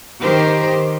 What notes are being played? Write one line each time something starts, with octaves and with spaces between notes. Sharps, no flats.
D#3 G4 A#4 C5